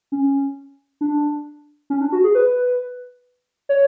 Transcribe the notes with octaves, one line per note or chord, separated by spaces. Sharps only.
C#4
D4
C#4
D4
F#4
G#4
B4
C#5